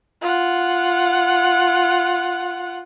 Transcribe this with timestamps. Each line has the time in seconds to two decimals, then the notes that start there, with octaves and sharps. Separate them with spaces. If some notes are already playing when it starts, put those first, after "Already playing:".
0.22 F4 F#5